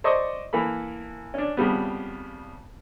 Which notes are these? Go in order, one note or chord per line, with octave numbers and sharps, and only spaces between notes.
C5 D5 D#5 C#6 D#6
E3 A#3 A4 B5
C#4 D4
F2 C#3 G3 B3